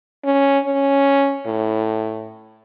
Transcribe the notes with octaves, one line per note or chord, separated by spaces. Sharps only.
C#4
C#4
A2